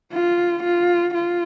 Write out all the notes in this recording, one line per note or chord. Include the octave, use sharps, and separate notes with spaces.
F4
F4
F4